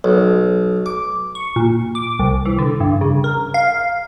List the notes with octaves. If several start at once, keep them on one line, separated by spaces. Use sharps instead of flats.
B1
D6
C#6
A#2
D6
C2
E3
D3
G2
C#3
A#4
F5